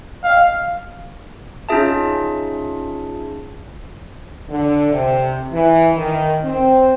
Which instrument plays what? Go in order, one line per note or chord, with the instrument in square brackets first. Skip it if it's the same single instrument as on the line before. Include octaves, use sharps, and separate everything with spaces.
[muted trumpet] F5
[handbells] C#4 D#4 F4 G#4 E5 A5
[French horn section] D3
C3
E3
D#3
C4